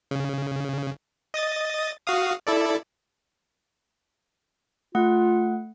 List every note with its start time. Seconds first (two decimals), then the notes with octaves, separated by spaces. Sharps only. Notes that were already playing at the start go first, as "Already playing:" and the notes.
0.11 C#3
1.34 D#5 D#6 A6
2.06 F#4 F5 D#6
2.47 E4 A4 D5
4.95 A3 F4 F#5